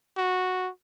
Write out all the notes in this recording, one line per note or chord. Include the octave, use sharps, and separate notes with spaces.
F#4